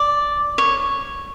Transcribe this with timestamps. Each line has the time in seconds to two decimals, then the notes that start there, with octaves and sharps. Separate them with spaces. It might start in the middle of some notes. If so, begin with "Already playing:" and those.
Already playing: D5
0.58 C#5